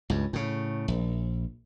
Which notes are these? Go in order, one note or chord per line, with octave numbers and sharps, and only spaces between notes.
C#2 G2
A2 C#3
A#1